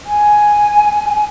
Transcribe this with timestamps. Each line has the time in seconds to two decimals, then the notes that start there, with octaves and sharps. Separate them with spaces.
0.06 G#5